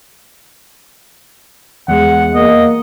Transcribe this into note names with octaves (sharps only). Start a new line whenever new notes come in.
E2 G#3 F#5
A#3 D#5